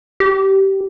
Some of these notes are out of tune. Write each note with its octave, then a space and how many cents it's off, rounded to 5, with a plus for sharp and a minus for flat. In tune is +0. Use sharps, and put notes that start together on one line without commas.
G4 -15